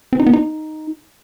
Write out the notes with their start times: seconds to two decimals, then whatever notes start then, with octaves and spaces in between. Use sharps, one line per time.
0.13 C4
0.20 D#4
0.27 B3
0.33 D#4